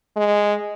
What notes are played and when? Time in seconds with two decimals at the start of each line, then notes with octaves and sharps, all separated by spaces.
0.16 G#3